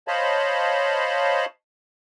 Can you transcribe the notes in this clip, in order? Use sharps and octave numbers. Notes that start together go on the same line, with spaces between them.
C5 C#5 D#5 F5 A5 B5